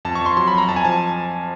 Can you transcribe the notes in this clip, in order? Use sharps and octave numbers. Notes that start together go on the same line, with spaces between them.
F2 A5
C#6
F2
C6
F#3 C6
B5
F2 A#5
F2 A5
G#5
F3 A5